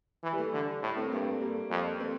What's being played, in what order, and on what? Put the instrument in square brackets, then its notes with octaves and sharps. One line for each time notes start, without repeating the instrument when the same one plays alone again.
[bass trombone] E3
[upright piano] G3
A3
[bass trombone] D3
A2
[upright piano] C4
A#3
[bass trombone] G2 [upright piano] A3
[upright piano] G3 A#3
[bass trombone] F2
[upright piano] A3 C4